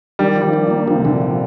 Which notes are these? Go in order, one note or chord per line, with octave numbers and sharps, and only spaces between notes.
D#3 G3 D4
F3
D#3 G3
D4
A#3
D3 F3
C3
A#2 D3 F3
F3